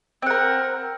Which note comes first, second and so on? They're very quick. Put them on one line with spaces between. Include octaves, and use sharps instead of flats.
C4 F#5 A#4